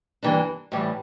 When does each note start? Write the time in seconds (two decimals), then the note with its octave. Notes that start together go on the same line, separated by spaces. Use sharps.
0.23 G2 E3 A#3 D4
0.72 A2 E3 G3